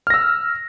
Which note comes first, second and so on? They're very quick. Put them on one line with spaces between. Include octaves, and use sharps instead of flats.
F6 A#6 E6